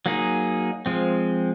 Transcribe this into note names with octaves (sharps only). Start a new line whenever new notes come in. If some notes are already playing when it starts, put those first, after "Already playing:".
F#3 A#3 D#4 G#4
F3 G#3 C4